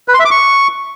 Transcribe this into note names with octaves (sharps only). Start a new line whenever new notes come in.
B4
C6
E5
D6
C#6